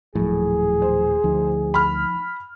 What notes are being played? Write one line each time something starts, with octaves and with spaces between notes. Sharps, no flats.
D#1 A2 F3 F#3 G#4
C5
D2 F3 D#4
B5 F6